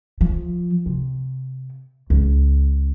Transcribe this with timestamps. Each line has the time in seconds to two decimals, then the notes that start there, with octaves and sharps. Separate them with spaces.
0.21 F3
0.86 C3
2.10 C#2